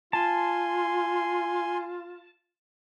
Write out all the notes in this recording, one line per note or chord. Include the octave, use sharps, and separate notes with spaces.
F4 G#5 A5 C6